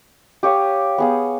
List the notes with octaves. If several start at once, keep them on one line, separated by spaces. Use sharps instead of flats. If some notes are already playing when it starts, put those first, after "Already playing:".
G4 C#5 F5 D#6
B3 G#4 F5